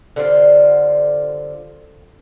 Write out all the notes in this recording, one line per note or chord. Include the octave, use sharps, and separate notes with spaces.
D3 G3 C4 F4